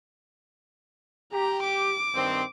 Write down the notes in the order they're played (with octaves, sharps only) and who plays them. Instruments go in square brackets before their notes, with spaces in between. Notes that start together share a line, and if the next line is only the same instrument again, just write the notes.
[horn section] G4 [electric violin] A#5
[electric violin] D6
[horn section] G2 D#3 C4